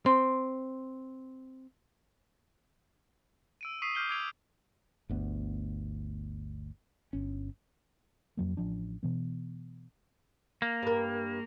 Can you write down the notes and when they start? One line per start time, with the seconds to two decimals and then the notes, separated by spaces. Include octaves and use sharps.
0.06 C4 C6
3.61 E6 D7 D#7
3.82 C#6 D#6 B6 C7 D#7
3.95 D6 D#6 F6 G6 C7 G7
4.09 D6 E6 G#6 D7 F7
5.09 G1 D2 B3
7.13 G1 C#4
8.37 F2 F#3 A#3
8.57 A1 F3 D4
9.03 B2 E3 B3
10.62 A#3
10.83 G2 A#4